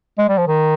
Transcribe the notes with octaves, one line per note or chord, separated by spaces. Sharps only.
G#3
G3
F3
D#3